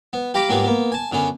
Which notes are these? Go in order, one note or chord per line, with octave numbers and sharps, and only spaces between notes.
B3
G4 F5 A#5 B5 D6
G#2 F#3 G3 A#3 B3 F4
A#3 B3
G#5 A5
F#2 D3 B3 C#4